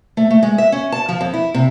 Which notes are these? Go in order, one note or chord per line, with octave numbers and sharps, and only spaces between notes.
A3
A3
G#3
E5
C#4
A5
F3
F2
E4
C3